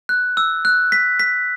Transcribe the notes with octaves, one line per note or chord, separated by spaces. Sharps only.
F#6
E6
F#6
B6
B6